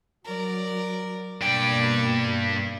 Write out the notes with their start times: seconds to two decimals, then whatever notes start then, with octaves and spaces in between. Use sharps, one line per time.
0.25 F#3 A#4 D5
1.41 G2 B2 A#3 D5 G5